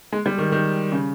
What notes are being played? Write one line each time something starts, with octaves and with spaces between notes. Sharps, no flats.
G#3
G3
D#3
D#3
C#3